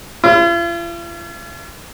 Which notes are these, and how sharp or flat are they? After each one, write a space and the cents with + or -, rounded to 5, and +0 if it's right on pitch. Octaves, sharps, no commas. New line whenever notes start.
F4 -45